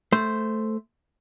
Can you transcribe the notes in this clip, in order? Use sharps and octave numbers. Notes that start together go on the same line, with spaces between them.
A3 C5